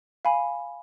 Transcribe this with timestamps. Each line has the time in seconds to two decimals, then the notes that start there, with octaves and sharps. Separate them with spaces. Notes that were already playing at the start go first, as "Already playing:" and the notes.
0.25 F5 G#5 B5